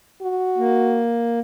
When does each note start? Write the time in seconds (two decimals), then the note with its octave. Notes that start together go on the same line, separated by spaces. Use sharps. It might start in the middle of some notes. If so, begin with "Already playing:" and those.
0.22 F#4
0.58 A#3